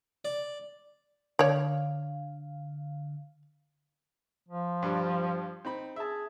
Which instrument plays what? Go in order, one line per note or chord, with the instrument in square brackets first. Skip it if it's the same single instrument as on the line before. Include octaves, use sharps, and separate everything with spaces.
[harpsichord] D5
[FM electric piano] D3 F5 [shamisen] C#5 D5
[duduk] F3
[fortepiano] G2 G3 D4
C4 D#4 B5
[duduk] G#4 [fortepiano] E5 A5